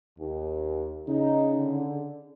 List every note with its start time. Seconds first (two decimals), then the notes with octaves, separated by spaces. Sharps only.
0.19 D#2
1.08 C#3 D#4
1.57 D3